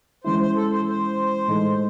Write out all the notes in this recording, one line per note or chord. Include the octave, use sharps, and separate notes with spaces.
E3 G#3 C#4 E4 C5
C5
A4
C5
C5
A2 E3 G#3 D#4 A4